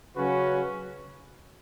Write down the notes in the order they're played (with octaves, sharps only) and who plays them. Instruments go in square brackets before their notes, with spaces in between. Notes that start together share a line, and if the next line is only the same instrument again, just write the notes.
[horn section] C#3 F#3 C#4 F#4 B4